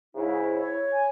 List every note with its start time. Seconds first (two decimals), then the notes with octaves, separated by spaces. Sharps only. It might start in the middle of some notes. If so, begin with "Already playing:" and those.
0.15 G#2 C#3 E4
0.53 C#5
0.91 G#5